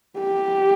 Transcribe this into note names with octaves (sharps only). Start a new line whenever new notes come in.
G4